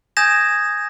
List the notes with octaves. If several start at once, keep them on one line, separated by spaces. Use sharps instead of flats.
G#5 D#6 G6 G#6 A#6 E7